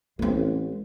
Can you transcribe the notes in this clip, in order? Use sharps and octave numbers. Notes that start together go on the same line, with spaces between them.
A1 G#3 C4